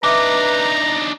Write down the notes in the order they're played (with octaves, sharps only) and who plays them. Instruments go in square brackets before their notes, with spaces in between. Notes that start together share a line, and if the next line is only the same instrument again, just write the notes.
[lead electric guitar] D4 D#4 [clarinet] B4 [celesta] E5 D6 [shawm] A#5